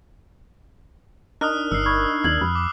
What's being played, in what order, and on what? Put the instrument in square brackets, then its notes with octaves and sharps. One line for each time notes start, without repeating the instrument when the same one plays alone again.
[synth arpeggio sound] D4 D#4 A#4 [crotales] D#6 F6 F#6
[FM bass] G1 [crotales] E6 C7
[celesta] B5 C#6 G#6
[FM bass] D#2 [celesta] G#6 F#7
[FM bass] F2 [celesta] B5
[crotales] D6